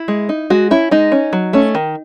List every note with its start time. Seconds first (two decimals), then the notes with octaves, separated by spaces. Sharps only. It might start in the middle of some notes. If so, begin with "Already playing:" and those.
Already playing: E4
0.08 G#3
0.29 D#4
0.50 G#3 F#4
0.71 C#4 E4
0.91 G#3 D#4
1.12 C#4
1.33 F#3
1.53 A3 C#4
1.75 D#3